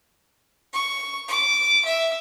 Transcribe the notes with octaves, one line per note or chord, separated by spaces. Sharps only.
C#6
D6
E5